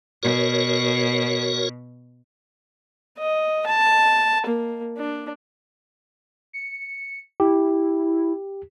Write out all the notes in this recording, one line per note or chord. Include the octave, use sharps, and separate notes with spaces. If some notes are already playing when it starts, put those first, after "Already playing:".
B2 F#4 A#4 C#5
D#5
A5
A#3
D4
C#7
E4 G4